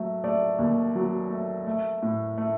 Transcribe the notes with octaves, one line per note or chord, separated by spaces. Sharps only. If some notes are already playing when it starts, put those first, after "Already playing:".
Already playing: F#3 A3
A3 D5
D#2
F#3
A3
A3
A2
A3